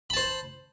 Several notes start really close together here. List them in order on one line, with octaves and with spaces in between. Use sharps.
B5 A5 C5